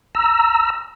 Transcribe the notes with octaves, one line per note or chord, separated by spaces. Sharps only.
A#5 E6